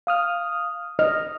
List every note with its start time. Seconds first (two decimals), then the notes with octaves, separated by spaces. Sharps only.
0.07 F5 D#6 F6
0.99 D#5 F6